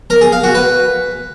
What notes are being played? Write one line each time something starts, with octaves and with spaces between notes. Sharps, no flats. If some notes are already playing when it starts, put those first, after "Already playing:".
A#4
G#4
F5
F#4
B4